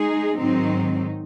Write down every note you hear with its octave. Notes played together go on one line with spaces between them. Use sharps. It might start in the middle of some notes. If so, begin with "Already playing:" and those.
Already playing: G#3 D#4 G#4
G#2 D#3 F#3 C4 D#4